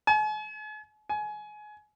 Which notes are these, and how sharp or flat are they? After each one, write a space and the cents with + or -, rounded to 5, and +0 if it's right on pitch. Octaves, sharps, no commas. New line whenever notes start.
G#5 +45
G#5 +25